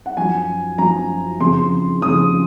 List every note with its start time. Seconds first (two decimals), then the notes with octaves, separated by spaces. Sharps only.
0.06 F#5
0.17 F#2 F3 G#5
0.78 F#2 F3 A#5
1.40 F2 C#3 F3 C6
2.02 F2 C#3 F3 D#6